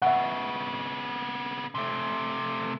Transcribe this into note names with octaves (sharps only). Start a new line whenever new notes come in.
C#3 B3 E5 F#5
C3 A3